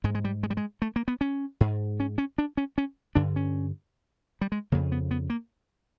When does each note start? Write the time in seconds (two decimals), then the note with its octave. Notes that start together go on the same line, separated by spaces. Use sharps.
0.04 G#2 G#3
0.15 G#3
0.24 G3
0.43 G#3
0.50 G3
0.57 G#3
0.82 A3
0.96 A#3
1.08 B3
1.21 C#4
1.61 G#2
2.00 C#4
2.18 C#4
2.38 D4
2.57 C#4
2.78 C#4
3.15 G2 D3 D4
3.36 C#4
4.41 G3
4.52 G#3
4.72 F2 C#3 A#3
4.92 B3
5.11 B3
5.30 A#3